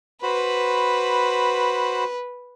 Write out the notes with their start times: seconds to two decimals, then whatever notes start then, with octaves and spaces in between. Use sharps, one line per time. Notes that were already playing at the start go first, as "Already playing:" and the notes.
0.23 F#4 B4 C5 B5